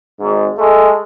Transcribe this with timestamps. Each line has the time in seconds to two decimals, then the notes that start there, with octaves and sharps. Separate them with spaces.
0.20 G#1 G#2
0.57 G#3 A3